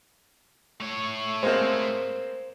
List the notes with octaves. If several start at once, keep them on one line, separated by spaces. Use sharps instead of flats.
A3 C#5
G#3 A#3 C4 C5